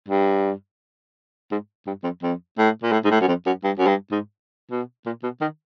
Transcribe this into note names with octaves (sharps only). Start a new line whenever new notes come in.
G2
G#2
G2
F2
F2
A2
A#2
A2
G#2
A2
F#2
F2
F#2
G2
F#2
G2
G#2
B2
A#2
B2
D#3